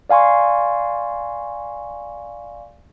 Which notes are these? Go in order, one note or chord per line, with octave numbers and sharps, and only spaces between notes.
D5 F5 G#5 C6 C#6